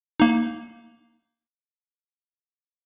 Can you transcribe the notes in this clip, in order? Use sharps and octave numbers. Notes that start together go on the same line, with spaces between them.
A#3 D#4